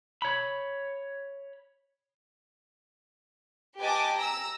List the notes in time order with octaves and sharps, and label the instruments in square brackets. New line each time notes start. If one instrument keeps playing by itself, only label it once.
[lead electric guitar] C#5 B5
[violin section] G4 B4 D#5 G#5 A5 D6
A#5 E6